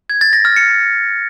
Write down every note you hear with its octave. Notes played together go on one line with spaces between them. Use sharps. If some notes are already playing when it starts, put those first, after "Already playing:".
G#6
A6
A#6
F6
C#7